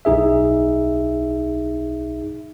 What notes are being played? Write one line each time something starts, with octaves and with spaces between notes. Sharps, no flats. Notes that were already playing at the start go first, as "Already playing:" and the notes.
B1 D#4 G#4 E5